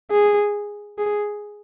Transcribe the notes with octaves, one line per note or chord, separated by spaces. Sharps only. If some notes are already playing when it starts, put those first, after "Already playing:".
G#4
G#4